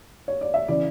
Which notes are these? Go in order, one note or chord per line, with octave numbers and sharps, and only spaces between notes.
C#5
D5
E5
C#3 E3 D5